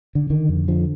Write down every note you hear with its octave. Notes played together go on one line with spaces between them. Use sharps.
D3
D3 D#3
F2
D3 F3